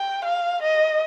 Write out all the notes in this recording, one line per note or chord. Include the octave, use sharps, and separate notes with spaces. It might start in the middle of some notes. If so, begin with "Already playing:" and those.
Already playing: G5
F5
D#5